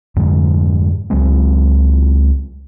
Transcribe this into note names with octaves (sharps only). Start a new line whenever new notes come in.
F2 G#2 D3 G#3
C#2 F#3 G#3 C4